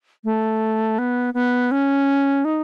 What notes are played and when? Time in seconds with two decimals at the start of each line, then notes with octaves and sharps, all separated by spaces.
0.24 A3
0.98 B3
1.34 B3
1.71 C#4
2.44 D#4